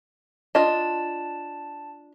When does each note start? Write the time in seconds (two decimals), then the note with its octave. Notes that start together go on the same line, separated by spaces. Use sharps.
0.55 D4 F4 D#5 A5